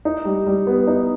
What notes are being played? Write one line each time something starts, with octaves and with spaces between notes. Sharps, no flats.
D#4
G3
G3
B3
D#4